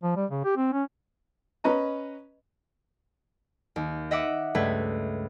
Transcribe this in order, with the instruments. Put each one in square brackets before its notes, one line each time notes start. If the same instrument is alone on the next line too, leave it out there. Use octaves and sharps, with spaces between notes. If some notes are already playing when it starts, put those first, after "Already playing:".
[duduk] F3
G3
C#3
G4
C4
C#4
[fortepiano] C#4 B4 D#5 A#5 B5
[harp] D#2
D#5 E5 F#5 D6
C#2 G2 A3 B4 G#6